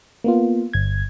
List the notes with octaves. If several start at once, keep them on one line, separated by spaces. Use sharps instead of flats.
A#3 B3 F4
G1 G#6